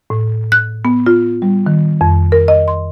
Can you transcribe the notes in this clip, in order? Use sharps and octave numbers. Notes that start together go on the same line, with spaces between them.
A2
F#6
B3
F4
G3
D#3
F2
A#4
D#5
C6